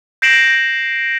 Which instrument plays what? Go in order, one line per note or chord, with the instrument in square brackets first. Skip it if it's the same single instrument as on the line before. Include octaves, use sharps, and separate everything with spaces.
[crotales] G6 A#6 C7 D7 E7 F#7